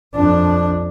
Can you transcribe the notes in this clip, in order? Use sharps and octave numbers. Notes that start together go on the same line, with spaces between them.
F2 D4